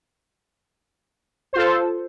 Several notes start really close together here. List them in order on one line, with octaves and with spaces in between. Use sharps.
C5 F4 A4